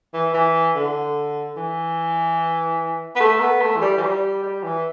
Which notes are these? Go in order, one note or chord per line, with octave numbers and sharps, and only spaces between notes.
E3
E3
D3
E3
B3
A3
B3
A3
E3
G3
E3
G3
G3
E3